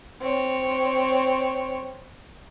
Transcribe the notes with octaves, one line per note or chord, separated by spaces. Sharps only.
C4 C#5